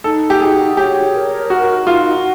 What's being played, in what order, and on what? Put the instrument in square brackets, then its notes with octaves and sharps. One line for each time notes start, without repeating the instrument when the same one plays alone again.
[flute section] D#4 [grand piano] A4
[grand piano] G4
[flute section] F#4 [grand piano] G#4
[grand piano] G4 [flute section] C#5
[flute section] A#4
[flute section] D#4 [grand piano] F#4
[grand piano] F4 [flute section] F#4